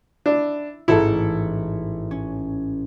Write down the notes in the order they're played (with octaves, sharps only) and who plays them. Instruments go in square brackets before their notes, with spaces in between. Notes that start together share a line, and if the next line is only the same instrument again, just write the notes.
[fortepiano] D4 [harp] E4
[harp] A1 G#2 [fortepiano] E4 A4
[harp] C#4